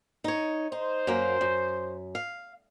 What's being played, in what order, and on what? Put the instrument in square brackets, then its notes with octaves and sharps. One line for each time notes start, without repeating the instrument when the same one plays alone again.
[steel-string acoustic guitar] D#4 C#5
[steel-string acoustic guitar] D#4 [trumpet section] C5
[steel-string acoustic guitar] F#2 F#3 A#3
F#2
F5